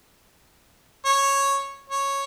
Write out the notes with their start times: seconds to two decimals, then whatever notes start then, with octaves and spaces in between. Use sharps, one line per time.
1.05 C#5
1.90 C#5